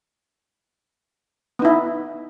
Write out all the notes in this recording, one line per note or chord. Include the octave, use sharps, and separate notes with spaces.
B3 D#4 E4